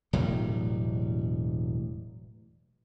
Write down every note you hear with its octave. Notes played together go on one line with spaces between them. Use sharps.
E1 A2 F#3 G3